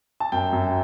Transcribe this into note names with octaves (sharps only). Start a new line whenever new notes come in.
A5
F#2 G5
F#2